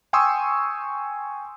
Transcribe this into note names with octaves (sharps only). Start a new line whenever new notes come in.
G5 G#5 C6 C#6 D#6 E6